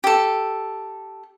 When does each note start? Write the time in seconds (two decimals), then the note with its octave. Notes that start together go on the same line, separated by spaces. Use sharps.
0.04 G4 A4